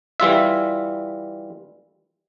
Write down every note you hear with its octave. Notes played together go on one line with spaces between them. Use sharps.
E3 G3 F4 E5